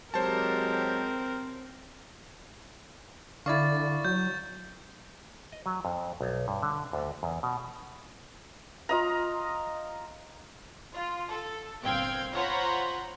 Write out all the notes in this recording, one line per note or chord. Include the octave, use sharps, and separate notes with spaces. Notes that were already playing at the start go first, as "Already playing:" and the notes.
F#3 G#3 C4 G4 A#4 C5 C#5 A5
D3 E4 D5 F5 C#6 A6
F#3 G6
D#5
F#3
F2
B1
G2
D3
D2
E2
B2
F4 D#5 A#5
F4
A4
G1 A#2 C4 F5 G5 G#6
F4 C5 C#5 F#5 A#5 B5